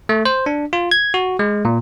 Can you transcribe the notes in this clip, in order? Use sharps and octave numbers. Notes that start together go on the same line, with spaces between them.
A3
C5
D4
F4
G#6
F#4
G#3
A#2